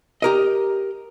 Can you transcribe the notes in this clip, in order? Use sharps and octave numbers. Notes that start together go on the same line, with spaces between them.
G4 A#4 D#5